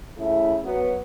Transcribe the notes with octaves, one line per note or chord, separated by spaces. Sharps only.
C#3 A3 E4
F#3 B3